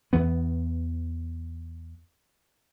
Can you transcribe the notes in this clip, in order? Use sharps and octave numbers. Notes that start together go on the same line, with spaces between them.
E2 E3 B3